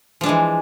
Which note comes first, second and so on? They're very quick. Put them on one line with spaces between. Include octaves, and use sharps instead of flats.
F3 D4 G#3 E3